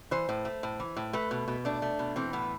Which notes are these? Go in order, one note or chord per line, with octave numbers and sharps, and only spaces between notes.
E3 C5
A2
A3
A2
E3
A2
A3 B4
B2
B2
A3 D4
A3
B2
E3 C4
A2 B3